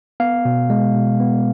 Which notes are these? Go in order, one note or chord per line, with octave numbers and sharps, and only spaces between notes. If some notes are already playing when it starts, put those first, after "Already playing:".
B3 F5
B2
G#3
B2
B3